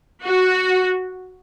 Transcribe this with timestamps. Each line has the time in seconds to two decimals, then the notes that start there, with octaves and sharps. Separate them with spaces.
0.23 F#4